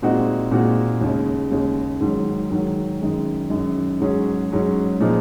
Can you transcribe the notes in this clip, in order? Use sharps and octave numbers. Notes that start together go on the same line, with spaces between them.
A#2 G#3 C4 D#4 F#4
A#2 G#3 C4 D#4 F#4
D#2 C#3 G#3
D#2 C#3 G#3
G#2 D#3 F#3
G#2 D#3 F#3
F#2 D#3 G#3
F#2 D#3 G#3
G#2 F#3 C#4 G#4
G#2 F#3 C#4 G#4
A#2 F3 G#3 D#4